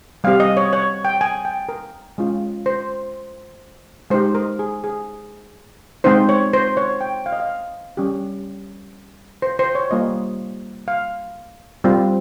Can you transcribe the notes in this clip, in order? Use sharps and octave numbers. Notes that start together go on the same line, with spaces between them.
G3 C4 G4 F5
D#5
C#5
C#5
G5
G#5
G5
A#4
G#3 C#4 F4
C5
G#3 D#4 G4 C5
A#4
G#4
G#4
G#3 C4 D#4 C5
C#5
C5
C#5
G5
F5
D#5
F5
G3 C#4 G4
C5
C5
C#5
G3 A#3 F4 D#5
F5
G3 C4 F4